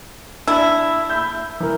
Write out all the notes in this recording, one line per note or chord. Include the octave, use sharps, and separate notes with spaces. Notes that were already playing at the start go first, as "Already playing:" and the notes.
D4 E4
B5 E6 G6
E3 A#4